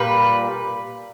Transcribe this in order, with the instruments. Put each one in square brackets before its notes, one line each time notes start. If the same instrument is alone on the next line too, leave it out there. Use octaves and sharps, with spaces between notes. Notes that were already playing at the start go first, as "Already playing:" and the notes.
Already playing: [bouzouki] A#2 G3 B4